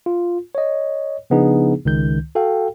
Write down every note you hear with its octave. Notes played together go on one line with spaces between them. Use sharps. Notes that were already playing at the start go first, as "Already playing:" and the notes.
F4
C#5 D#5
C#3 F3 B3 D4 D#4 G#4
C#2 D#3 G6
F#4 A4 F5 G5